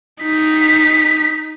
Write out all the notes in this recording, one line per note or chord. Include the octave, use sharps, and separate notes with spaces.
D#4 B6